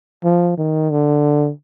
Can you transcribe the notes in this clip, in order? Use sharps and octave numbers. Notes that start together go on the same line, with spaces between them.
F3
D#3
D3